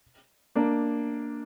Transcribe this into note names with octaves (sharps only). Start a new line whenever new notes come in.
A#3 D4